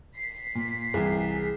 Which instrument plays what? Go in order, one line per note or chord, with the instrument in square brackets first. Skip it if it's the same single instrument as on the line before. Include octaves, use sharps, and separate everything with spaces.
[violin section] B6 C7
[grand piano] A#2
[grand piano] C2 E3 [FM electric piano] G#4